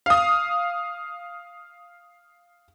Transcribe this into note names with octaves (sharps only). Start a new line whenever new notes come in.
F5 D#6